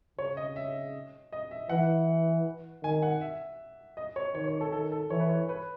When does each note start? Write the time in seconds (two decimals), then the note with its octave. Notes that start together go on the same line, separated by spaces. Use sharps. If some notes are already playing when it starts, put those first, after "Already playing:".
0.18 C#3 C#5
0.37 D#5
0.56 E5
1.32 D#5
1.51 E5
1.69 E3 F#5
2.83 D#3 G#5
3.03 F#5
3.21 E5
3.97 D#5
4.16 C#5
4.34 D#3 C#5
4.48 C#5
4.61 A4
4.72 D#3 A4
4.92 A4
5.10 E3 C#5
5.20 B4
5.29 C#5
5.49 B4